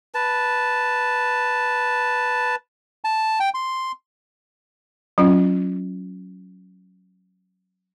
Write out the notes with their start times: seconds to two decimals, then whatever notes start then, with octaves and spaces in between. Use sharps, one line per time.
0.15 B4 A5
3.04 A5
3.40 G5
3.54 C6
5.18 F#3 C#4 F4